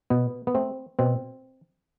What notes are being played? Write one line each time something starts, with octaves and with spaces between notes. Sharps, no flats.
B2 B3
B3
A3 C4
B2 C4